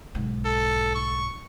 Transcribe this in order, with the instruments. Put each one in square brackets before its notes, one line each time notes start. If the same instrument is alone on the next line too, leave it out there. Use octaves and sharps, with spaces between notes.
[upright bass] B1 G#2
[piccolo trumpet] A4
C#6